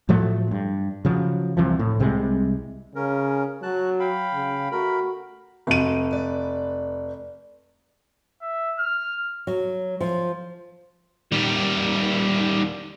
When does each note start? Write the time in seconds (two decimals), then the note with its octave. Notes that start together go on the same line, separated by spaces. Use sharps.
0.09 A2 F3 F#3 A3
0.51 G2
1.05 C#3 F3 F#3
1.57 C2 C3 E3 F3
1.79 A2
2.00 C2 C3 G3 G#3
2.95 C#3 C#4 A#4
3.63 F#3 F#4 A5 F#6
4.00 F5 G5 B5
4.33 C#3
4.72 A3 F#4 A#4 B5
5.67 F1 F#3 F#4 F5 D#7
6.11 B4 D5
8.42 E5
8.79 F6
9.47 F#3
10.01 F3
11.32 D#3 G3